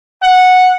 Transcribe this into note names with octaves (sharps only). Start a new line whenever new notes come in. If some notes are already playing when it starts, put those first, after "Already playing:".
F#5